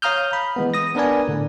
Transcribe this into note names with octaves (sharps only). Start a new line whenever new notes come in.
C#5 F5 A#5 D#6 F6 G6
B5
E3 G#3 B3
D#6 A#6
B3 D4 A#4 B4 D5 G#5
A2 D3